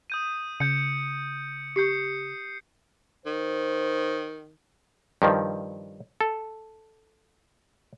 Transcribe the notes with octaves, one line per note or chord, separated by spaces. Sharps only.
D#6 G6 D#7
C#3 G6 C#7
G4 C#6 G6 C7 C#7
D#3 C5
G2 D#3 F3
A4